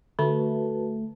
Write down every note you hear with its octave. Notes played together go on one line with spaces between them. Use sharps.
D3 A3 F#4 B4 A5